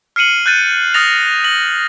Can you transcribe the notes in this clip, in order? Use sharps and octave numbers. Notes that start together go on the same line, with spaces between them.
F6 C7 C#7 D#7 F#7
F#6 G6 A6 D#7
D#6 F6 A6 A#6 F7
A#6 F#7